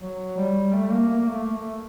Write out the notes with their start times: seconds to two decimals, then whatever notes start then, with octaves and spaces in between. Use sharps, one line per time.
0.01 F#3
0.37 G3
0.73 A3
0.91 A#3
1.09 A#3
1.27 A3
1.46 A3